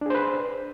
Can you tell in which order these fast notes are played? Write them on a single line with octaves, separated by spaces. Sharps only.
D4 G#4 C5 B4